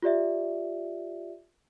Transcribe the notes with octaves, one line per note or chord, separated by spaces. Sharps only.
F4 G4 D5 E5